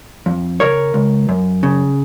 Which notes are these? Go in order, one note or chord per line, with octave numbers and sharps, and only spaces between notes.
F2
C#3 A#4 C#5
C#2
F#2
C#3